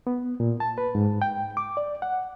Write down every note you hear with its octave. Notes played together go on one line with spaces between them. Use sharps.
B3
A#2
A5
B4
G#2
G5
D6
D5
F#5